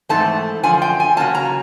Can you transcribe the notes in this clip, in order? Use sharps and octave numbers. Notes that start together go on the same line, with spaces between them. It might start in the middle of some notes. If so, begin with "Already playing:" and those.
G#2 E3 A3 C4 A5
F#2 D3 F3 G#5
G5
G#5
C#3 F#3 A#3 C#4 A5
A#5